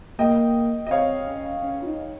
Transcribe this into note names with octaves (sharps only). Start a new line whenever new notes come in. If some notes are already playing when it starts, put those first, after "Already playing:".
A#3 D#5 G5
D#5
C4 C#5 F5
C#4
C#4
F4
D#4